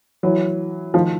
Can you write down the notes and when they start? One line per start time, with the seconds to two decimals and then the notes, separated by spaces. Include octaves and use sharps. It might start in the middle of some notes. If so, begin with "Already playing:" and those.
0.23 E3 F#3
0.94 D#3 F3